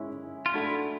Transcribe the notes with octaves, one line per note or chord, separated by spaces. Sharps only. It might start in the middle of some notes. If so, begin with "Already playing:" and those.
Already playing: G#3 C#4 E4
F4
A3 D4 E4 F#4 A4